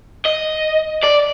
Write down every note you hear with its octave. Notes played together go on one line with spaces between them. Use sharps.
D#5
D5